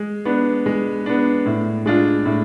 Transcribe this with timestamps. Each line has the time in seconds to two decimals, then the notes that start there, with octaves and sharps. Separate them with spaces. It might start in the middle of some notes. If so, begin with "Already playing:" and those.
Already playing: G#3
0.25 B3 D4
0.66 G#3
1.06 B3 D4
1.46 A2
1.86 G#3 D4 F4
2.26 A2